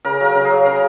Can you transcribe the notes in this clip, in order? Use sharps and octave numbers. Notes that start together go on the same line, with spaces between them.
C#3 A#4
F#3 A#4
C#3
G#4
F#3
C#3 A#4